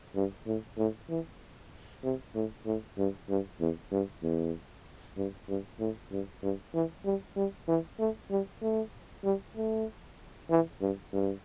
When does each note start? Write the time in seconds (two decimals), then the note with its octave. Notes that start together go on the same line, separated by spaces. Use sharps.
0.15 G2
0.47 A2
0.78 A2
1.09 E3
2.04 C3
2.35 A2
2.66 A2
2.98 G2
3.29 G2
3.60 E2
3.92 G2
4.23 E2
5.17 G2
5.49 G2
5.80 A2
6.11 G2
6.43 G2
6.74 E3
7.05 G3
7.36 G3
7.68 E3
8.00 A3
8.31 G3
8.62 A3
9.24 G3
9.56 A3
10.51 E3
10.82 G2
11.13 G2